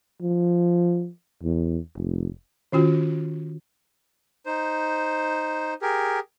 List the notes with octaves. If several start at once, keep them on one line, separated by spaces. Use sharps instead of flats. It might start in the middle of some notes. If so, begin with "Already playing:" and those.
F3
E2
F1
D#3 C#4 F4 F#4
D#4 C5
G4 G#4 A#4